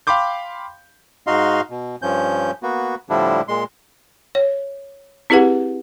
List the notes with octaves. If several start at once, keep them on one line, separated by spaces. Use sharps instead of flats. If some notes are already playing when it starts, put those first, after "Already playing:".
F5 G5 B5 C6 D6 G6
G#2 D#4 F#4 D#5 F5 C6
B2
G2 F3 C#4 G6
A#3 B3 F#4
A2 D3 F3 G3 D4 E4
A#2 G#3 C6
C#5
C4 E4 G4 G#4 B4 F#5